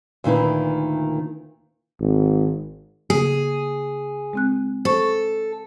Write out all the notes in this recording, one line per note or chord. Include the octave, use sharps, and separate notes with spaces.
D2 A#2 D#3 E4 B4
G#1
C#3 A#3 G#4
G#3 C4 F#6
A4 C5 C#6